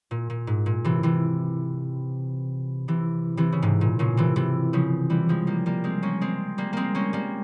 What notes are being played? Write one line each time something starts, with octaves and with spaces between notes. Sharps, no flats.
A#2
A#2
G#2
A#2
C3 E3
C3 E3
C3 E3
C3 E3
C#3
G#2 C3
A#2
A#2 C#3
C3 E3
C3 E3
C#3 F3
E3 G3
F3 G#3
G3 A#3
G3 A#3
G#3 C4
A#3 C#4
G#3 C4
G3 A#3
G#3 A#3 C4
A#3 C#4
G3 A#3